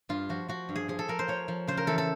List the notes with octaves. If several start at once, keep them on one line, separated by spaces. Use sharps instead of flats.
G2 F4
F3 F#4
F3 F#4
G2
G#4
F3 G#4
A4
F3 A#4
C5
F3 C#5
F3
C#3 C5
A#4
E3 A4
A4